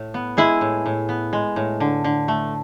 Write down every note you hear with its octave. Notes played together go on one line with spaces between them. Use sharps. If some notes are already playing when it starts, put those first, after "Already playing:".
Already playing: A2
B3
G#3 E4 G#4
A2
A2
B3
G#3
A2
D3
D3
A3